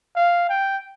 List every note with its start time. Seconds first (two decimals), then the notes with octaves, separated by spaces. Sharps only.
0.16 F5
0.49 G5